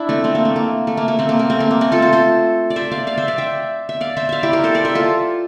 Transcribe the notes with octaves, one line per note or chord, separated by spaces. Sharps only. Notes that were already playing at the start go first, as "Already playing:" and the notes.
Already playing: D4 E4
A3 C4
A3 C4
A#3
A3
A#3
A3
A#3
A#3
A3 C4
A#3
A#3
A3 C4
A#3
A#3
A3 C4
F4 A4
A4 C5
A4 C5
D5
C5 E5
D5 F5
D5 F5
C5 E5
D5 F5
E5 G5
E5
D5 F5
C5 E5
D5 E5 F5
E4 G4
G4 A#4
A4 C5
A#4 D5
C5 E5
F4 A4